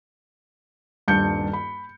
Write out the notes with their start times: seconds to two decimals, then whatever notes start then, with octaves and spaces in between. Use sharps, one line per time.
1.08 D#1 G2 A5 G6 C#7
1.53 B5